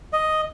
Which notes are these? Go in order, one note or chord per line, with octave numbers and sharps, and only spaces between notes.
D#5